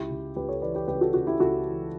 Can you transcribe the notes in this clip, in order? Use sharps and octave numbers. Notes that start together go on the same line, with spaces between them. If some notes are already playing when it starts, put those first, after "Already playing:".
Already playing: C#2 E4 G4
C#3
C#2 G4 B4
A4 C#5
E3 B4 D5
G4 B4
C#2 G4 B4
F#4 A4
C#3 F#4
E4 G4
C#2 F#4 A4
E3